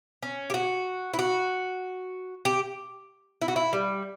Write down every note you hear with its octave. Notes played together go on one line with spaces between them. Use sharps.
C#4
G4
F#4
E4
F#4
G4
E4
F#4
E4
G3